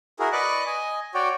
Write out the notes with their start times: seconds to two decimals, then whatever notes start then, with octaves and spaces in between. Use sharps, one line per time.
0.20 E4 F#4 G#4 A#4
0.32 B4 D5 D#5 C#6 D6 F#6
0.66 D#5 G#5
1.14 F#4 C#5 D5 G5